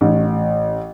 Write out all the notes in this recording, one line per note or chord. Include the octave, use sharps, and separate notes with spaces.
A1